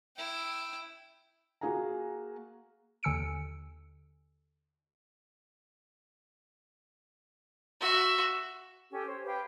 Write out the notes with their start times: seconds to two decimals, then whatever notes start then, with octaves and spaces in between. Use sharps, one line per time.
0.17 E4 G5
1.61 A#3 F#4 G#4 F5 G#5 A#5
3.03 D#2 D3 G#5 E6 C#7 D7
7.81 F#4 E5
8.92 C#4 G4 A4 G5
9.05 C5 C#5
9.24 G4 B4 F5 G5